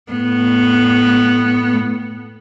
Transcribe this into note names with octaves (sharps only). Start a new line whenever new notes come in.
A2 B3